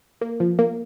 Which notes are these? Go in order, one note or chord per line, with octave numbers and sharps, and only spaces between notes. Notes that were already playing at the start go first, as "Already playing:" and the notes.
A#3
F3
A#3